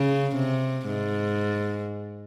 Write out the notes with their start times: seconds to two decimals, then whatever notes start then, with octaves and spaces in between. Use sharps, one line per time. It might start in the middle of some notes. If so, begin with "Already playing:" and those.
Already playing: C#3
0.36 C3
0.87 G#2